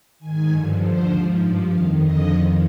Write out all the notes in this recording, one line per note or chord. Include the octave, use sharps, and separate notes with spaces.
D#3 G#5
G#2
G2 D3 F3
D#2 D3 F3 C5
G#2 F3
G2 F3 D5
F2 D#3 F5
F2 D3 F3 D#5
F2 D#3